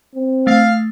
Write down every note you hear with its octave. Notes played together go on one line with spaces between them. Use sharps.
C4
A3 F5